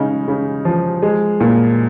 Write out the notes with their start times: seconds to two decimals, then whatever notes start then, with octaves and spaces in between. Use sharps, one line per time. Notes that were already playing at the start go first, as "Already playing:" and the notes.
Already playing: C#3 G#3 D#4
0.28 C#3
0.65 F3
1.02 G#3
1.40 A#2